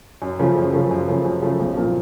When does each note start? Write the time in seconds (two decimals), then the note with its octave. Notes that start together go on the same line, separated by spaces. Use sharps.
0.22 F#2
0.39 C#3 F3 A3
0.57 F#2
0.73 C#3 F3 A3
0.91 F#2
1.08 C#3 F3 A3
1.25 F#2
1.42 C#3 F3 A3
1.60 B1
1.77 A#2 F3 A#3